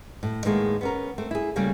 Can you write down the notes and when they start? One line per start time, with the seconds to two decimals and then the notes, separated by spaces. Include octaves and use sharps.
0.23 A2
0.45 A2 D#3 G#3 A#3 B3
0.81 B3 C#4 A#4
1.18 A3 C4
1.31 E4 G#4
1.56 C#3 G3 A3 A#3 C#4